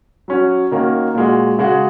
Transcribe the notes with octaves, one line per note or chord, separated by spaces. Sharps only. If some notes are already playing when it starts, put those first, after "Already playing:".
F#3 C#4 F#4
D#3 A#3 C#4 F#4
A#2 G#3 F#4
C#3 G#3 F#4